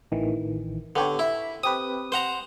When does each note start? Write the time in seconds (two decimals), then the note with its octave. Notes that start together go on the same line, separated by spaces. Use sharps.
0.12 A1 D#3 E3
0.96 D3 B3 G4 C#5
1.19 E4 B5
1.63 C4 G4 B4 D#6
2.12 C5 F#5 A#5